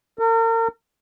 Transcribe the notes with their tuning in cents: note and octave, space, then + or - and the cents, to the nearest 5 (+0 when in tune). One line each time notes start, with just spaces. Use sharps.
A#4 -40